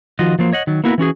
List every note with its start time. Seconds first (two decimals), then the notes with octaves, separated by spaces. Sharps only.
0.19 D#3 F3 F4 F#4 D#5
0.39 F3 F#3 A#3 C5
0.52 C#5 D#5 F#5
0.67 D#3 F#3
0.84 A#3 B3 E4 F#4 A#4 B4
0.98 E3 C#4 F#4 G#4